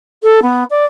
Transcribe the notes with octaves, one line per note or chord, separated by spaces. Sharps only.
A4
B3
D5